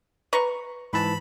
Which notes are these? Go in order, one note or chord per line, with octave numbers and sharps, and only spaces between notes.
B4 A#5 C#6
G#2 E3 A5 B5